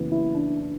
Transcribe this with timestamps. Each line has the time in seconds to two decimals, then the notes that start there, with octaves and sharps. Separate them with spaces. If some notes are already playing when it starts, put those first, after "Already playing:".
Already playing: F#1 F#2 E3 B3
0.12 E4
0.35 D4